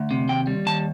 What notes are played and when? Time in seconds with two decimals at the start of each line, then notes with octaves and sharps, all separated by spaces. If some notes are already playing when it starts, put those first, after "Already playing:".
Already playing: D2
0.11 C3
0.29 D#2 G5
0.47 G3
0.66 D#2 A5